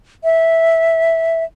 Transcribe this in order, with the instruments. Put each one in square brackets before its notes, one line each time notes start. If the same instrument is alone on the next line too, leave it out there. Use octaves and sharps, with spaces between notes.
[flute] E5